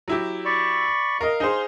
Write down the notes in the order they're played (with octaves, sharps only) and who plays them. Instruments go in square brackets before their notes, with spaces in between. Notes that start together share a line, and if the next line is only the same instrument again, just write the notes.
[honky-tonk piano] F#3 E4 G4
[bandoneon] D5 B5 C#6
[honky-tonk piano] A#4 D#5 [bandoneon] F5
[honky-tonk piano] D#4 G#4 C5